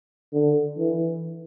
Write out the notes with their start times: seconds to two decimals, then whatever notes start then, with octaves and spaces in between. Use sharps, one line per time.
0.34 D3
0.78 E3